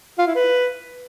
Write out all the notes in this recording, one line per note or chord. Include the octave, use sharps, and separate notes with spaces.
F4
E4
B4